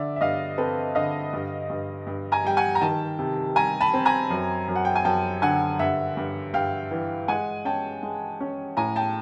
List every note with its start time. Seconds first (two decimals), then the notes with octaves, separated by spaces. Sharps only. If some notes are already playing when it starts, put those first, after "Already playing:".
Already playing: D3 D5 E5
0.16 E5
0.21 G2 D#5 F5
0.58 C4 A4 B4
0.95 D3 D#5 F5
1.33 G2
1.70 G2
2.07 G2
2.32 G#5 A#5
2.44 G3 G5
2.57 F#5 G#5
2.75 A#5
2.81 D#3 G5 A5
3.19 C3
3.56 G3 G#5 A#5
3.81 A5 B5
3.93 C4
4.05 G#5 A#5
4.30 F#2
4.68 F#2
4.76 F#5
4.85 G5
4.96 G#5
5.04 F#2 G5 A5
5.42 D3 F#5 G#5
5.79 G2 E5 F#5
6.17 G2
6.54 G2 F5 G5
6.91 E3
7.28 G#3 F#5 G#5
7.65 C#4 G5 A5
8.03 G#3
8.40 C#4
8.77 A2 G#5 A#5
8.96 G5 A5